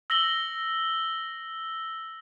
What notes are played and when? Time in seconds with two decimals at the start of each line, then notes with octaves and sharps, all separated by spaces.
0.10 E6 A#6 F#7 G7